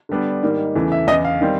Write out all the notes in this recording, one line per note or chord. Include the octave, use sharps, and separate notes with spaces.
D3 G3 B3 D4
G#2 D#3 G3 A#3
E2 C#3 E3 A3
E5
E2 C#3 E3 D#5
F5
D#3 G3 C4